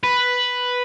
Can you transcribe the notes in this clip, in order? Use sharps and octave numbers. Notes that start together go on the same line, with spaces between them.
B4